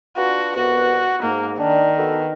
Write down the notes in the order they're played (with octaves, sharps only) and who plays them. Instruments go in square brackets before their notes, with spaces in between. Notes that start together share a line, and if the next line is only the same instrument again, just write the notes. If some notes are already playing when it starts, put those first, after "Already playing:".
[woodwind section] D4 F4 B4 [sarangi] F#4
[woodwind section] C2 B2 B3 [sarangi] F#4
[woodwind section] G#2 [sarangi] A#3
[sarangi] D#3 [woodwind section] D4
[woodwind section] B3 F#4 A4